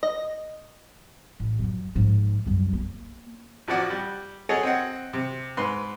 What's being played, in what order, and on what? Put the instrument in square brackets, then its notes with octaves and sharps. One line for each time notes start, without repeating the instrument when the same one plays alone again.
[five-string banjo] D#5
[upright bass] A1
F#2 F3
G#2 F3
C2 F#2
A#3
[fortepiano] A1 F3 F#4 D5 F#5
G3
G#4 A4 C#5 D#5 F#5 A5
C4 D#5 F#5
C3
G#2 B4 C6